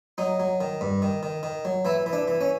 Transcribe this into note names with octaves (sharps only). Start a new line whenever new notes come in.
F#3 D#4
F#3
D#3
G2
D#3
D#3
D#3
F#3
E3 E4
E3
D4
E3
C#4